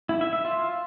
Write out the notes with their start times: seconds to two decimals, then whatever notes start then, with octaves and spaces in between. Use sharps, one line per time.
0.09 E4
0.21 E5
0.33 E5
0.45 F4